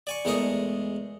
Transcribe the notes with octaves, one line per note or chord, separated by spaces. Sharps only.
D5 G#5 C#6
E2 G#3 A3 A#4 C#6 D#6